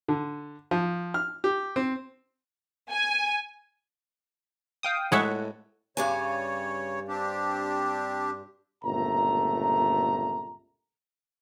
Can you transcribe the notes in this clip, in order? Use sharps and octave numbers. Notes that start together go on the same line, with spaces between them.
D3
F3
F6
G4
C4
G#5
F5 G5 D#6
A2 G#3 C#5 E5 F#5
G2 C#3 G3 C#5 G#5
C4 D4 G4
G1 C#2 A#2 A3 A#5